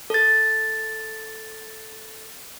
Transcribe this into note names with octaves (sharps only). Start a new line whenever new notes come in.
A4 A6